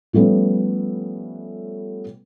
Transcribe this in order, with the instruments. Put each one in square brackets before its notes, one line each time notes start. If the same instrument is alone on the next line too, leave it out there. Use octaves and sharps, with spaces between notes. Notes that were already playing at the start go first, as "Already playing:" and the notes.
[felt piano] F3 G3 A3 B3 C#4